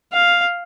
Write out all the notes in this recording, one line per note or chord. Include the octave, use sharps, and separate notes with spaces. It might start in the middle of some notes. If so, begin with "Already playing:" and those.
F5